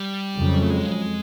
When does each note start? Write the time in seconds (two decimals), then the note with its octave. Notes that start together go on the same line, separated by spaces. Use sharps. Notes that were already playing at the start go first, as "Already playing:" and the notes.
Already playing: G3
0.37 F2 C#3 F#3
0.62 A3
0.70 G#3